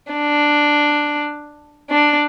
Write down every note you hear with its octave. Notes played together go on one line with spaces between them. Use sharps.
D4
D4